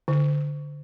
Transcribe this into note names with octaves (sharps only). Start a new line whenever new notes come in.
D3